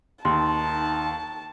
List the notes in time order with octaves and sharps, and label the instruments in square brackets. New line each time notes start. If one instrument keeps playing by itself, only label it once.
[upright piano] D#2 [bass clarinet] D#4 [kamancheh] A5 [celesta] C6